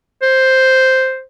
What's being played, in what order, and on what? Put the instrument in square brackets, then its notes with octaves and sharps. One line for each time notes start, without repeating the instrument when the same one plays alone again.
[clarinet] C5